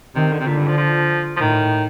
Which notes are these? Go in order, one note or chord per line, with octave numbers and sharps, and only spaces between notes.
C3 D#3
D3
C3
A#2 D3
G2
F3
F3
F3
A2 D#3